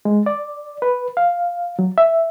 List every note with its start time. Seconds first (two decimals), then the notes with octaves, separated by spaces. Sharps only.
0.05 G#3
0.26 D5
0.82 B4
1.17 F5
1.79 F#3
1.98 E5